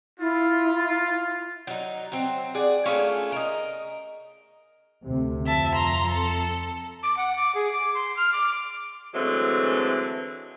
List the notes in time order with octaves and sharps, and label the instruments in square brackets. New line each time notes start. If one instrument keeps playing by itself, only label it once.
[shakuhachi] E4 [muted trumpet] F4
[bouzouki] F#3 D#4
F#3 C4
G#4 D5 F#5
A3 C#4 F4 G#4
A#4 D#5
[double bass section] D2 C3
[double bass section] F2 [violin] E5 A5
[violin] A#5 C6
A4
[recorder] D6
F#5
D6
G#4
D6
C6
F6
D6
[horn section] D3 E3 F#3 G#3 A3 C4